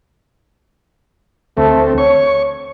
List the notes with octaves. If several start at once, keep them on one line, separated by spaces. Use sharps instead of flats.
D2 A3 C4
C#5 C#6